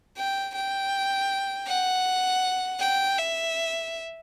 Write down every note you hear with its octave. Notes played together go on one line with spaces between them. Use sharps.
G5
G5
F#5
G5
E5